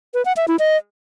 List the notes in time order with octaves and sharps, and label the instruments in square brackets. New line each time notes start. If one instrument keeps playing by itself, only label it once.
[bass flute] B4
F#5
E5
E4
D#5